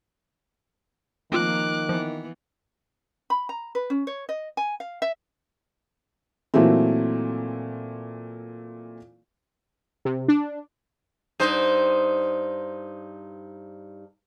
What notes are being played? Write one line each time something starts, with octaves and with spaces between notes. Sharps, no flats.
D#3 F3 A3 A#3 C4 F4 D6 F#6
E3 F3 B3
B5
A#5
B4
C#4
C#5
D#5
G#5
F5
E5
A#2 E3 F#3 A3 C4
C3
D4
G2 D#4 C5